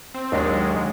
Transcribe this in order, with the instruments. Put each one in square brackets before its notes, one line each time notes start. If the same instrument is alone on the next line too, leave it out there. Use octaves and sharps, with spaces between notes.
[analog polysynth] C4
[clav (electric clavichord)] D#2 D4 A#4 [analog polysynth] D#3 F#3 G#3